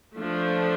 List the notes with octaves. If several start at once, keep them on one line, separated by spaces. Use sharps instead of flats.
F3 A3 D4